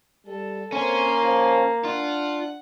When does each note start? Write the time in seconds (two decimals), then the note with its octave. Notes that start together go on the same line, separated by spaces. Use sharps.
0.26 G3 A4
0.72 A#3 C4 C#4 G#5 C6
1.22 F3
1.85 D4 F4 F#5